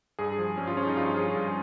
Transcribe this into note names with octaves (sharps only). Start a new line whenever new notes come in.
G2 G#4
F3
G2 C#4
F4
F3 C#4
D#4
G2 F4
F3 G#4
G2 F4